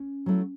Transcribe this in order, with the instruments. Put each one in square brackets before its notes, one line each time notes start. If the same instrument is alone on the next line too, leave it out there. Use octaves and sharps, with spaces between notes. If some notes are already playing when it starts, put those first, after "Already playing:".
Already playing: [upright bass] C#4
[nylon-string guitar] F#3 A3 E4